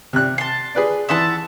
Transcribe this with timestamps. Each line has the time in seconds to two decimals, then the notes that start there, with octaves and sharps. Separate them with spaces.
0.13 C3 F#6
0.38 A5 C6
0.75 G#4 B4 D5
1.09 E3 E5 F#5 A5 C6 D#6